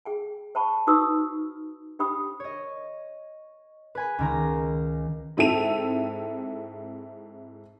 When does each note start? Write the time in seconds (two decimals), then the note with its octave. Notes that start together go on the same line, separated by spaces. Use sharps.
0.05 G#4 G5 G#5
0.55 C5 G5 A5 B5 C#6
0.87 D#4 F#4 B4 C#6 D#6 E6
1.99 D4 G4 C5 G5 B5 D#6
2.40 C#5 D#5
3.95 B4 G#5 B5
4.19 C#2 D#3 A#5
5.37 G#2 C4 E4 A4 D#7 F7